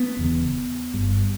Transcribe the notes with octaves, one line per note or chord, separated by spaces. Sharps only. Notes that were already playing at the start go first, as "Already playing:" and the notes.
Already playing: B3
E1 E2 C#3
G1 G2